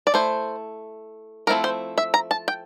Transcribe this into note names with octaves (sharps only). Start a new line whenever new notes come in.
D5
A3 E4 C5
F3 A3 C4 E4 A#4
C5
E5
A#5
A5
G5